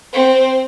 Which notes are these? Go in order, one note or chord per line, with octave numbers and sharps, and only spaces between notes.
C4